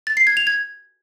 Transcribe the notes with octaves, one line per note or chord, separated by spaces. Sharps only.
A6
C7
G#6
F7
G#6